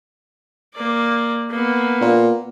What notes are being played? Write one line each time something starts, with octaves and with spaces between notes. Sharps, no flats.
A#3 D5
A#3 B3
A#2